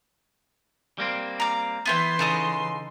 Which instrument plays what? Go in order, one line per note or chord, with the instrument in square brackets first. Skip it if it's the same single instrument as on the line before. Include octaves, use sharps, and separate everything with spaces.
[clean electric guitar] G3 A#3 C4
[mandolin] A#5 D6
[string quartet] E3 B4 C6 [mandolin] B3 E4 G5
[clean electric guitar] C#3 [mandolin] D#4 A4 D#5